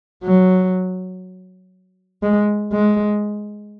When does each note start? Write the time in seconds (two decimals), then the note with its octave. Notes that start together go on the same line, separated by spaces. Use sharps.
0.23 F#3
2.23 G#3
2.72 G#3